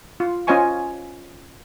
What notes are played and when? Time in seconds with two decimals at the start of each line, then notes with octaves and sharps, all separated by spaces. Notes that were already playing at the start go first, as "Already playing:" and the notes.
0.20 F4
0.47 C#4 F4 C5 D#5 G#5 C#6